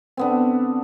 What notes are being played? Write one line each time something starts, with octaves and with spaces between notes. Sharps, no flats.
D3 B3 C4